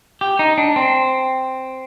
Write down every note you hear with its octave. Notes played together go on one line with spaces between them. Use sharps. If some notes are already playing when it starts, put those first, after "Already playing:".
G4
D#4
D4
C4